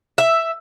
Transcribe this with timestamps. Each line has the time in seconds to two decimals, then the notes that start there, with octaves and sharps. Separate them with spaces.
0.18 E5